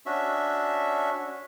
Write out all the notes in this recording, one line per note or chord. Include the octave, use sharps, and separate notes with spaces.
C#4 D4 F#4 E5